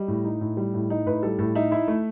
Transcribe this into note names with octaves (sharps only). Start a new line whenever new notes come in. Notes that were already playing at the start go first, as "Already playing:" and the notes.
Already playing: G3 D#5
A2
D#4
A2
G3
A2
D#4
A2 B4
G3 A4
A2 A4
D#4 E5
E4 E5
A3